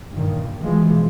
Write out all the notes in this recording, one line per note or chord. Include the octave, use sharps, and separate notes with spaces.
G2 A#2 D#3
B2 E3 F3 G#3